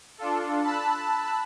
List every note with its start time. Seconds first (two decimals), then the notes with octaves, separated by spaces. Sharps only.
0.18 D4 F4 A4
0.62 A5 B5 E6 F#6